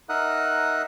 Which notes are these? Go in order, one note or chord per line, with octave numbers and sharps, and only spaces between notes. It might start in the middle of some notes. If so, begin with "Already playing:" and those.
D#4 A#4 E5 F#5 D#6 F#6